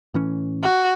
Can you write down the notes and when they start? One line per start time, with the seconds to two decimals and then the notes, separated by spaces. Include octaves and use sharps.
0.14 A2 E3 C#4
0.63 F#4